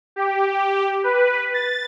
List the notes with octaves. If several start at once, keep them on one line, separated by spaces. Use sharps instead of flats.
G4
B4
A6